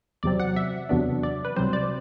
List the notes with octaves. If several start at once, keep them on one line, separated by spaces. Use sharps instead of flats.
E2 C3 F#3 C4 D5
F#5
E5
E2 C3 F#3 B3 D4
D5
B4
C2 C3 F#3 C4 C5
D5